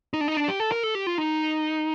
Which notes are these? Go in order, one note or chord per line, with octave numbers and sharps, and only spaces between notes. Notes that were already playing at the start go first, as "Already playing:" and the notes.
D#4
D4
D#4
D4
G4
A4
A#4
A4
G4
F4
D#4